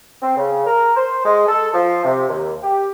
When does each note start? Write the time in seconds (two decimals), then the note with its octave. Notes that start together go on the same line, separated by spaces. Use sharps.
0.22 C4
0.37 C#3
0.67 A#4
0.97 C5
1.25 G#3
1.48 A4
1.74 F3
2.05 C3
2.29 D#2
2.63 G4